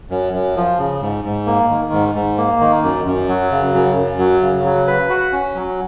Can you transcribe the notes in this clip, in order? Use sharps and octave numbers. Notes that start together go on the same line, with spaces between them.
F#2
F#2
F3
C#3
G#2
G#2
A#3
D#3
G#2
G#2
A#3
D#3
F#2
F#2
F#3
C#3
F#2
F#2
F#3
C#3
F#3
B4
F#4
C#4
F#3